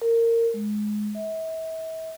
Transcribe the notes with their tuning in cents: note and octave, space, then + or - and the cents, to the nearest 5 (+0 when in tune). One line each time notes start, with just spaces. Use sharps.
A#4 -20
G#3 +15
E5 -40